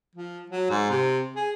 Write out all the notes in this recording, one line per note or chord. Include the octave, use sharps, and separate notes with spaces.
F3
F#3
G#2
C3
G#4